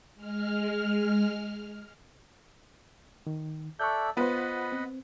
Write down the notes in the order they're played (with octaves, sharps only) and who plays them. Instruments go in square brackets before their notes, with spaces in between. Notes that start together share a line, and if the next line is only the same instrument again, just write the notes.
[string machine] G#3 F6
[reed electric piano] D#3
[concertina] A4 D5 E5 [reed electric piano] C#6 F#6 G6
[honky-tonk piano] B3 B4 [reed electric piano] F4 C5 [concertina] D#5 F#5 B5
[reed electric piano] C4